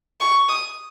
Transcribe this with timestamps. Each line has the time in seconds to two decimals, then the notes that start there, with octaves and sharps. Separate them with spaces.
0.20 C#6
0.49 D#6